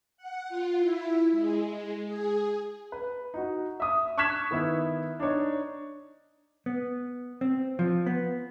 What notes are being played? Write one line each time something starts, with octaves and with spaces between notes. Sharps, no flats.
F#5
F4
E4
G#3
G#4
B4
D#4 F#4
E5 D#6
C#6 F6 F#6 G#6 B6 E7
D#3 B3 E4
D4 D#4 C#5
B3
C4
F3
B3